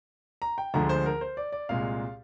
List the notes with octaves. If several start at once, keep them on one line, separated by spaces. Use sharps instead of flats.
A#5
G5
D2 D3 F3 G#3 A#5
C5
A#4
C5
D5
D5
C2 A#2 G#3 F5